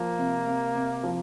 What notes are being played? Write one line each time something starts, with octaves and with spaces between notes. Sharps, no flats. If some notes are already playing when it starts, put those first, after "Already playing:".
Already playing: F3 A#3
C3
C3
C3
F3